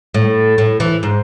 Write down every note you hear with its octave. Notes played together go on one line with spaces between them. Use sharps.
A2
A2
E3
G#2